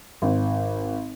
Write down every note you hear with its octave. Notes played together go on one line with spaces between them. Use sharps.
G#1